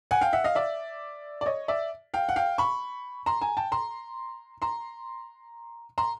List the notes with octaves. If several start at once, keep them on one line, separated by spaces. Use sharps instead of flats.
F#5 G#5
F5 G5
E5 F#5
D#5 F5
D5 E5
D5
C#5 D#5
D5 E5
F5 G5
F#5
F5 G5
B5 C#6
A#5 C6
G#5 A#5
G5 A5
A#5 C6
A#5 C6
A#5 C6